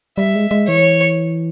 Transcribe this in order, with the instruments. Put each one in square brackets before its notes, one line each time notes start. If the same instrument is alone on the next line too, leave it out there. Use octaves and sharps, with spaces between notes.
[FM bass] G3 [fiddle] E5
[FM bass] G#3
G#3
[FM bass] E3 [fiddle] C#5